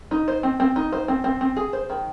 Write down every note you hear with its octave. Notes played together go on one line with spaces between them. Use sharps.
D#4
C5
C4
C4
D#4
C5
C4
C4
C4
G#4
C5
D#3